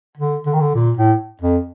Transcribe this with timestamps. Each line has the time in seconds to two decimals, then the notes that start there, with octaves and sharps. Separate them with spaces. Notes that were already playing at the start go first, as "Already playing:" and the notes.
0.17 D3
0.46 D3
0.53 D#3
0.61 D3
0.75 A#2
0.97 A2
1.42 F2